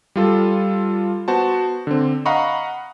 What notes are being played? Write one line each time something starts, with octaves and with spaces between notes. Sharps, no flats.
G3 F4 A4
B3 F#4 C5 A5
D3 C4
D#5 F5 F#5 A#5 B5 C#6